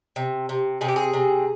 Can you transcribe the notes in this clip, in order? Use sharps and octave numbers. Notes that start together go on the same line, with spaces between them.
C3
C3
C3 G#4
G4
G#4
C3